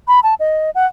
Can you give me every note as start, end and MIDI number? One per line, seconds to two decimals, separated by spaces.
0.08 0.20 83
0.23 0.34 81
0.40 0.70 75
0.75 0.86 78